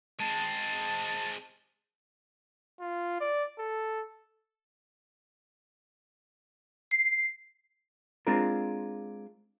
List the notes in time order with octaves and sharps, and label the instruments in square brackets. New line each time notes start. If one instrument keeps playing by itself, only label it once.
[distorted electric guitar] G#3 C4 [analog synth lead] A5
[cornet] F4
D5
A4
[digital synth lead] C7
[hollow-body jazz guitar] G#3 C4 D4 F4 A#4